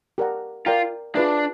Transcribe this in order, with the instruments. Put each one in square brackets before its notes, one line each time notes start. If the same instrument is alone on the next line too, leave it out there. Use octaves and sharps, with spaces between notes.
[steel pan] G4 A#4 D5 F#5 A#5
[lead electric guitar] F4 [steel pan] A#4 D5 G5 A#5
[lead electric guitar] D4 [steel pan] F4 G#4 B4 E5